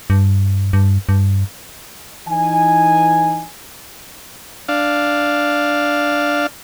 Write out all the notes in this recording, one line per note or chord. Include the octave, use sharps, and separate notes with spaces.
G2
G2
G2
E3 D#4 G#5
D4 F5